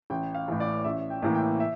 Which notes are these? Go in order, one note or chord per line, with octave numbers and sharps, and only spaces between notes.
A1 G5
F5
A2 E3
D5
A1 E5
G5
A2 E3 A#3
G5
E5